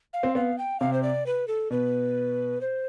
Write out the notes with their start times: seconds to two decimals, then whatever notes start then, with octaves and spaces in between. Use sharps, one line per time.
0.13 F5
0.23 C4
0.35 B3 F5
0.58 G5
0.80 C3 F5
0.93 C5
1.03 D5
1.26 B4
1.48 A4
1.70 B2 B4
2.61 C5